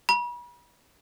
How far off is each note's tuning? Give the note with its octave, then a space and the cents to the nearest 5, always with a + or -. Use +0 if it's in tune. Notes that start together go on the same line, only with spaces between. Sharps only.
B5 -40